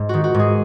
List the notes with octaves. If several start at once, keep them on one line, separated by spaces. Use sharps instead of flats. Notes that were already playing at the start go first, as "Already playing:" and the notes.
Already playing: G#2
D#3 F#4
F#4
G#2 G#4